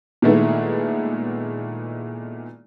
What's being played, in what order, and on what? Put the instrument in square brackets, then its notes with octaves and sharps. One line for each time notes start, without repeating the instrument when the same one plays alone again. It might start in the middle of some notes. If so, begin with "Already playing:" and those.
[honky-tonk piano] A#2 D#3 G#3 A3 B3 E4